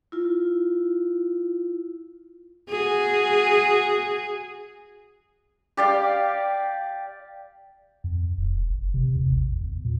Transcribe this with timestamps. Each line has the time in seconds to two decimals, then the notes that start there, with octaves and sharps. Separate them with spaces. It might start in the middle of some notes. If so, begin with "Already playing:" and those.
0.12 E4 F4
2.69 F#4 G#4
5.77 G4 D5 F5
8.04 F2
8.38 E1
8.70 F#1
8.94 C3
9.15 E2
9.31 A1
9.61 E2
9.85 A#2